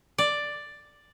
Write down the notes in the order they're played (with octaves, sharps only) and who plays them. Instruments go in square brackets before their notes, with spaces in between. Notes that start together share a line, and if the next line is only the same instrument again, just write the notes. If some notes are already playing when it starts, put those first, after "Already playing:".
[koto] D5